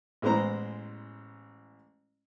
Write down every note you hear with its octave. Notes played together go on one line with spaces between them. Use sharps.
A1 G#3 B3 E4 C5 A#5